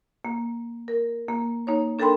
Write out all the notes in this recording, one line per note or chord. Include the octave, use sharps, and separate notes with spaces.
A#3
A#4
A#3
A#3 D#4 C#5
D4 A4 A#4 G5 B5 C6